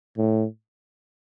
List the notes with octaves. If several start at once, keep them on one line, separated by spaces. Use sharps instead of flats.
A2